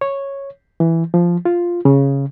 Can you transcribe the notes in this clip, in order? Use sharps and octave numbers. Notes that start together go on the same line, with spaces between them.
C#5
E3
F3
F4
C#3